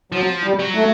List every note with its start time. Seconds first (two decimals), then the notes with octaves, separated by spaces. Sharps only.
0.12 F3 F#3
0.44 G3
0.59 F#3
0.75 A3